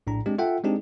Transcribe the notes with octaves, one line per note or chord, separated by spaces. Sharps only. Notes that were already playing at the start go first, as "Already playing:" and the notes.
A#1 A2 D4 A#5
G#3 C4 D4 G4
F4 A4 E5 F#5 G5
G#3 C4 D4 D#4 G4 G#4